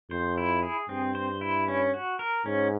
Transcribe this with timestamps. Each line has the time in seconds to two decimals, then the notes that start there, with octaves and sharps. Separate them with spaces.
0.11 F2 C5
0.38 E4
0.63 G#4
0.89 G2 C4
1.15 C5
1.41 E4
1.68 C#4
1.94 F#4
2.19 A#4
2.45 G#2 C#4